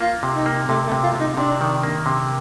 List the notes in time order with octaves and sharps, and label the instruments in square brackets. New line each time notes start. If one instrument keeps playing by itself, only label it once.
[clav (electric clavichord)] A#3 [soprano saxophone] F4
[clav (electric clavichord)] C3
[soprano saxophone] D#4
[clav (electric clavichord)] A#3
[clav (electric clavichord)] C3 [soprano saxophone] A3
[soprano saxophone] A3
[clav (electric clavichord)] C3
[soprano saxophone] F4
[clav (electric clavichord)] C3 [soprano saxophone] D#4
[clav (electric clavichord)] C3 [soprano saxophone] D4
[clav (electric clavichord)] D#3
A#3
C3